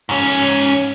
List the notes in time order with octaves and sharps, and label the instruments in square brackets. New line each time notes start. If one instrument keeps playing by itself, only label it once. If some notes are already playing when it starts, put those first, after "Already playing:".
[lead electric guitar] G#2 C#4